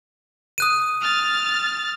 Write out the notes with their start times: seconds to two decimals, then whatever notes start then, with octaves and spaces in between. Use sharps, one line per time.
0.58 D#6 F#6 D#7
1.01 F6 A6